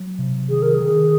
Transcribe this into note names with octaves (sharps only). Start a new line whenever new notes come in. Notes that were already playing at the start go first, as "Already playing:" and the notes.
Already playing: F#3
C3
D#3 G#4
A#4
G#4
D#3